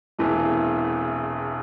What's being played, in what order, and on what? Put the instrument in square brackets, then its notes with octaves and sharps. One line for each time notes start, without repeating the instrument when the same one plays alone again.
[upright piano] E1 E2 C3 E3 A3